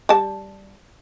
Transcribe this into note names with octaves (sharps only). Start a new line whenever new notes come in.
G3 A5